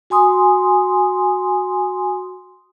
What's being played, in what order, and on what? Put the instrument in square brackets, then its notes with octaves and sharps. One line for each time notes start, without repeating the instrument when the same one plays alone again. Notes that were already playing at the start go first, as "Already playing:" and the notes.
[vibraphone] F#4 G#5 C6 D#6